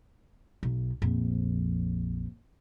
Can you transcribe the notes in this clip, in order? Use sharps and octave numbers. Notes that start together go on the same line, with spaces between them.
B1
A#1 F2